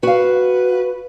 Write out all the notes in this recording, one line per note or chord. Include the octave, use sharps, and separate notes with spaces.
F#4 B4 F5